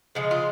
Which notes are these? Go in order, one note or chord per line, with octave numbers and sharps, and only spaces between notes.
C#3 F3 G#3
F4